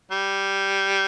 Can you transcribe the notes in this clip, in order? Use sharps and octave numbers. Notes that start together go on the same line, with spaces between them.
G3